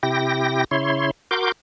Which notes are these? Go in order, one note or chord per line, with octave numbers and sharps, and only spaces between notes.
C3 E4 G4 G5 A#6
C#3 E4 C#5 C6
F#4 A#4 C6 D6 G6